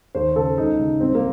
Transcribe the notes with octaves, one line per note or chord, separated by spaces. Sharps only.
D#2 C5
C#3 A4
C#2 D#4
C#3
C2 C4
A#3